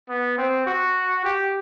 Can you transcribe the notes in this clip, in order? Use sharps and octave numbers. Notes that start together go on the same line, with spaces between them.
B3
C4
F#4
G4